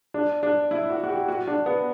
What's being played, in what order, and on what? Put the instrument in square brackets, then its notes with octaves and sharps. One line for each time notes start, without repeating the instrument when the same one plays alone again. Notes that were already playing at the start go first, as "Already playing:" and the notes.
[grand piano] D4
D4
E4
F#4
F#4
G4
F#4
D4
B3